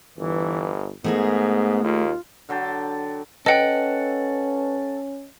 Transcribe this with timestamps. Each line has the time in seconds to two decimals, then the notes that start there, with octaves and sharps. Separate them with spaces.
0.18 G1 E3
1.04 G#2 A3 B3 G#4 A#4
1.83 D#2 F4
2.49 D3 F#3 G5 A5
3.46 C#4 A4 B4 D#5 F#5 G5